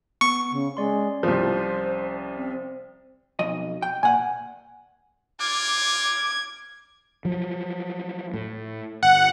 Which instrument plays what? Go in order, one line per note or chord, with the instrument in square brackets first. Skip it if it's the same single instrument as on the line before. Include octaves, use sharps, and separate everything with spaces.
[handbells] B3 [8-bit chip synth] C#6
[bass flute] C#3
[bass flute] G#3 [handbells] C#4 D5 C6
[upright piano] C2 F3 [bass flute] C5
[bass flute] C4
[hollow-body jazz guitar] B1 F2 D#5
G5
[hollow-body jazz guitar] A#2 F#5 [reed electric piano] G#5
[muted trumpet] F4 [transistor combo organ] D6 [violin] G#6
[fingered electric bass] F3 F#3
A2
[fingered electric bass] G1 [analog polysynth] F#5